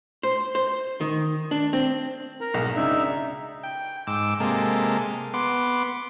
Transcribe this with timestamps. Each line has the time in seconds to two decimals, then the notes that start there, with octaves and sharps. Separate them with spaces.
0.23 C5
0.55 C5
1.01 D#3
1.51 D4
1.73 C4
2.41 A#4 A#5
2.54 B1 G#2
2.76 C#2 D4 D#4 E5
3.63 G5
4.07 G#2 D6 E6
4.40 C3 G#3 A#3 A4
5.34 B3 C6 D6